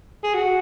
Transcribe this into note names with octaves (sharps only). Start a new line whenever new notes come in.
G#4
F#4